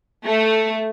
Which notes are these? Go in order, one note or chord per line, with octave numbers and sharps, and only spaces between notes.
A3